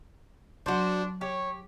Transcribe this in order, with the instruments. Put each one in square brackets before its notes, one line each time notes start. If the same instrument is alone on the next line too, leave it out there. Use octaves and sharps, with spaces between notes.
[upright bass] F#3 [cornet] D4 [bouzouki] F#4 C5
[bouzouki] G4 [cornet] C#5